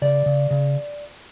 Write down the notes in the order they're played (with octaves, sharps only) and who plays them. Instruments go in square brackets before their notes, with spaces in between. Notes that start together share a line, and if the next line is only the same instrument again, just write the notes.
[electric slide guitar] C#3 D5
C#3
C#3